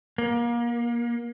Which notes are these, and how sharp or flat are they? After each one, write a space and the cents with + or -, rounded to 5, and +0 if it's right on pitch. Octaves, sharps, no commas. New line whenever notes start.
A#3 +30